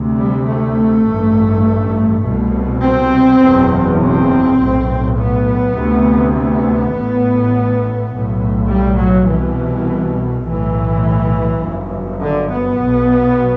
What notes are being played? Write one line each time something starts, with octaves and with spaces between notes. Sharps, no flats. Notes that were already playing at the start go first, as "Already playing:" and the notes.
Already playing: D2 C3
G3
A3
A1 G2
C2 B2
C4
F#1 E2 B2
C4
B1 A2
B3
D2 C3
B3
A1 A2
B1 A2
G3
F#3
C2 B2 E3
B1 A2 E3
G1 F#2
D3
B3
B1 B2